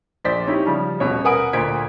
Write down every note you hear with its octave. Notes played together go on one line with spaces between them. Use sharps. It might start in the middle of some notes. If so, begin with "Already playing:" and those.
A#1 C5 D5 B6
C#4 D#4 E4 G4
C#3 F3 G3
D#1 B2 C#5
A#4 B4 F#5 G#5 D#6 D7
D2 A#2 C5 G#6 B6 D7